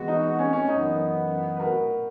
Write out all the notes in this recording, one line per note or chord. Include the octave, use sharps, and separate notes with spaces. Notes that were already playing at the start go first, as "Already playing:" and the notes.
Already playing: E3 G#3 B3 F#4
D#4
C#4
C#4
F#2 E3 B3 D#4
B4
F#4 A#4